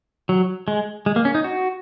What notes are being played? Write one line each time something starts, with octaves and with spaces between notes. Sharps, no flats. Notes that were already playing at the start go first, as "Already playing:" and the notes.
F#3
G#3
G#3
A#3
C#4
D#4
F#4